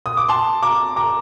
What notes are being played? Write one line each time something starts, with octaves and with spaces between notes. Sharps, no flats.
D#6
D6
A5 C6
A#5 D6
A#5 D6